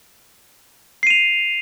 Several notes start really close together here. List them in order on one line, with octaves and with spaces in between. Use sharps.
C7 D#7 F7